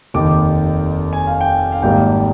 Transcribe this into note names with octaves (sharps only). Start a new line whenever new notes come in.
F1 D#2 D#3 D6
G#5
F5
G5
F5
G#1 G#2 G3 A#3 G5